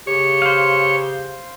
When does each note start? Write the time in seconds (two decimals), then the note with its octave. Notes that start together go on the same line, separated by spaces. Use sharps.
0.07 C#3 G4 C#5
0.42 C5 F5